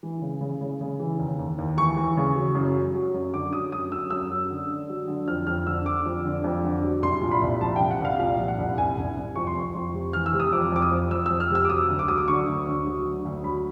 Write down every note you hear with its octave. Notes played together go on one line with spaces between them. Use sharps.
E3
C#3
C#3
C#3
C#3
E3
D#2
D#2
D#2
E3 C#6
E3
C#3
F#3
F#2
F#3
F#3
F#2
D3 D6
F#3 D#6
F#2 D#6
F#2 E6
F#2 E6
F#2
D3
D3
F#3
D3
F2 F6
F2 F6
D3 E6
D3 D6
F2
D3
F2
D3
F#3
C2 C6
A#2
B5
C2
F3 A5
C2 G5
F#5
C2 F5
A#2 F5
F3
F#5
C2
C2 G#5
C2
C2
F2 C#6
C6
F2 C#6
F2
C3
E3 F6
E6
C3
D#6
F2 D6
F2 D6
D#6
F2
F2 E6
F2 E6
F6
C3 E6
D6
F#3 D#6
D2
D6
F#3 D#6
D6
D3 C#6
D2
D2
F#3
D3
D2
F#3 B5